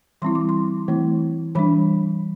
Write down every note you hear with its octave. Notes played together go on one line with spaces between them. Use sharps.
E3 G3 C4 E4 C6
D6
C6
E3 A3 C4 E4
E3 G3 D4 B5